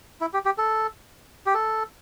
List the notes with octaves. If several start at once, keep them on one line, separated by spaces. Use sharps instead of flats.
E4
G4
G4
A4
G4
A4